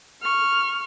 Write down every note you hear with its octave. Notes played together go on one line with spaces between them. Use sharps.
C#6 F6